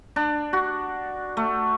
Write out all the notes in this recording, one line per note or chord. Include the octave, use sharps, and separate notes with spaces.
D4
F#4
A3